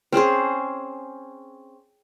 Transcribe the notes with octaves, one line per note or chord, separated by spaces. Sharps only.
C4 C#4 G#4 C5